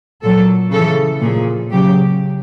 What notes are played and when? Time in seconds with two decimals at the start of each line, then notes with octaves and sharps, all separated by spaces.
0.22 A#2 F#3 A4
0.71 C#3 A4
0.77 E3
1.21 A#2 F3 G#4
1.71 C#3 F#3 G4